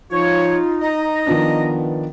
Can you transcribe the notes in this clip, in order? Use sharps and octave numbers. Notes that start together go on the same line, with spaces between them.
F3 D#4 F4 C#5
D#5 A#5
D#3 F3 B3 D4